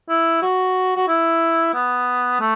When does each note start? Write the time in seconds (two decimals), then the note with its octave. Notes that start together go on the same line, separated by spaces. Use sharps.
0.09 E4
0.42 F#4
0.96 F#4
1.08 E4
1.74 B3
2.40 A3